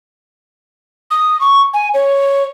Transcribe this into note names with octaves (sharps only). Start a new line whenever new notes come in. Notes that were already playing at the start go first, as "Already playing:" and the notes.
D#6
C#6
G#5
C#5